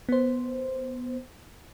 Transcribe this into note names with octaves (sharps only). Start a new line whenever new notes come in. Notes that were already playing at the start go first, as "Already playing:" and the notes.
B3 C5